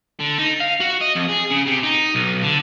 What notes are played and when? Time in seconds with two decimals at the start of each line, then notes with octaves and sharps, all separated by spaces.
0.20 D3
0.38 D#4
0.60 F5
0.81 F#4
1.01 D#5
1.16 F2
1.29 G#4
1.51 C#3
1.67 C3
1.83 D#4
2.15 B1
2.43 D3